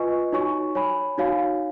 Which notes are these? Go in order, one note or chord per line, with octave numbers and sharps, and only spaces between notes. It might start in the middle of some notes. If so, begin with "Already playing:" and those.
Already playing: F4 B4 D#5 G#5 C#6
D#4 F#4 C#5 G#5 C#6
C#5 G#5 B5
D#4 F#4 C#5 F5 G#5